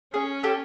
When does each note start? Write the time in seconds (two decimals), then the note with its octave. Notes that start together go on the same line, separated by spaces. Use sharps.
0.14 C#4 G#4
0.43 G4 A4